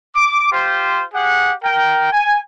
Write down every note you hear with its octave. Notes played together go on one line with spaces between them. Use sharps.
D6
F4 G4 C5
G4 G#4 F#5
A#4 G5
G#5